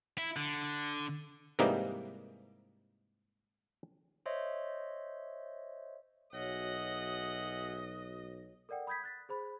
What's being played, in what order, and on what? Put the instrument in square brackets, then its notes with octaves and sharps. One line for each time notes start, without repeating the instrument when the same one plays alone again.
[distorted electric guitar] E4
D3
[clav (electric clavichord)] G#2 C3 E3 G3 A#3 D#4
[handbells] C5 C#5 D#5 E5 C6
[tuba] B1 [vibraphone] F#4 C#5 [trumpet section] G#4 E5 F#5 [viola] D#5
[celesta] A4 A#4 D5 F#5 G5
B5 D#6 G6 G#6 B6
F#6 A6 B6
G#4 C5 B5